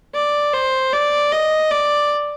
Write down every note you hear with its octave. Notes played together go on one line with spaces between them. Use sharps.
D5
C5
D5
D#5
D5